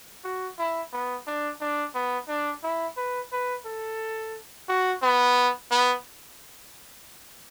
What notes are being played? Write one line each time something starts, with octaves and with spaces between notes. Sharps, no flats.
F#4
E4
B3
D4
D4
B3
D4
E4
B4
B4
A4
F#4
B3
B3